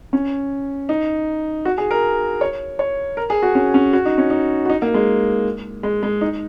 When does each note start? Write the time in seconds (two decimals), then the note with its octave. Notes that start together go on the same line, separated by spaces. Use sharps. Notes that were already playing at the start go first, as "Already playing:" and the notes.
0.13 C#4
0.89 D#4
1.65 F#4
1.78 G#4
1.91 A#4
2.41 C#5
2.79 C#5
3.17 A#4
3.30 G#4
3.42 F#4
3.55 C#4
3.74 C#4
3.93 F#4
4.05 D#4
4.18 C#4
4.30 D#4
4.66 F#4
4.70 D#4
4.82 A#3
4.94 G#3
5.83 G#3
6.03 G#3
6.21 D#4